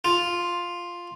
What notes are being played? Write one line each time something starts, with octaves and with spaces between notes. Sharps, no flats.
F4